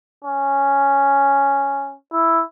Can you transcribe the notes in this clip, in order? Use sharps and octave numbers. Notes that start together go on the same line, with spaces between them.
C#4
E4